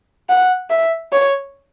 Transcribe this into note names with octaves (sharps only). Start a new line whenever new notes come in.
F#5
E5
C#5